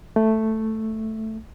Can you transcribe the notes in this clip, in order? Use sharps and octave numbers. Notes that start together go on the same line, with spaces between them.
A3